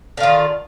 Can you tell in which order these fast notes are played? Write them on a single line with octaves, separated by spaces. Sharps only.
D3 F4 D#3